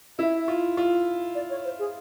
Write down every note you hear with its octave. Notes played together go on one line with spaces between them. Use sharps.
E4 E5
F4
F4
D5
C#5
C5
G#4